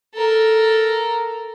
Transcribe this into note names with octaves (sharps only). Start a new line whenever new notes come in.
A4 A#4